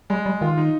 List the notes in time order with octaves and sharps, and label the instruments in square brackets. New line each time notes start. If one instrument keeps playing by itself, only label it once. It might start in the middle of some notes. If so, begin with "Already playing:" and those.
[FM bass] G3 [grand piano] G#3
[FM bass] G3
[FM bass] D#3 [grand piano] F4
[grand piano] D#4